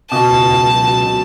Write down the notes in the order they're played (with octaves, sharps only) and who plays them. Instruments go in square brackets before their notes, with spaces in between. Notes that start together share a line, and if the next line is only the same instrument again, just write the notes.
[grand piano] B2 [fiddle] A5
[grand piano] C#2
C#2
F#3
F#3
B2